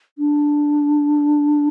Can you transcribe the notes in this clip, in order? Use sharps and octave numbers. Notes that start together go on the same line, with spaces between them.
D4